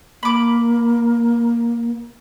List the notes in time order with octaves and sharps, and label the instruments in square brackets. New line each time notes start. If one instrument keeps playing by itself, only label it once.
[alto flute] A#3 [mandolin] B5 D6